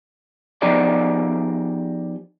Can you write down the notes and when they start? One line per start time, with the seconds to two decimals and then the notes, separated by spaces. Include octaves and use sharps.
0.62 F3 B3 D#4 G4 G#4 D5